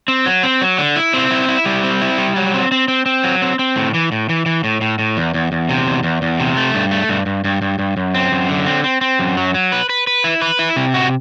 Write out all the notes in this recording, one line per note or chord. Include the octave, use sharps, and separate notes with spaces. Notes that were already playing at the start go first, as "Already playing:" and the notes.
C4
F#3
C4
F#3
D3
E4
C4
E4
E4
G3
C4
E4
G3
F#3
C4
C4
C4
C4
F#3
C4
C4
A2
E3
A2
E3
E3
A2
A2
A2
E2
E2
E2
C3
E2
E2
E2
C3
A3
G2
A3
G2
G2
G2
G2
G2
F#2
C4
F#2
D3
C4
C4
C4
F#2
F#3
F#3
B4
B4
B4
E4
B4
E4
C3
F#4